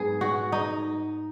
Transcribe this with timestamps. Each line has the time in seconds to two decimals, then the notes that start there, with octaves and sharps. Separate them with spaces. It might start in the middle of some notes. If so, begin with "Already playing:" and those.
Already playing: G#2 F#3 B3 G#4 B4
0.21 F#4
0.52 D#4